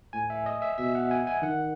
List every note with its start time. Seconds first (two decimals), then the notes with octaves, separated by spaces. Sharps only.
0.13 A2 G#5
0.30 E5
0.46 D#5
0.62 E5
0.78 B2 E5
0.95 F#5
1.11 G#5
1.27 G#5
1.43 D#3 F#5